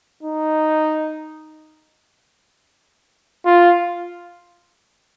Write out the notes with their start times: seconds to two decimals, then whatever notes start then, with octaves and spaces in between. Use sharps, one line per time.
0.23 D#4
3.46 F4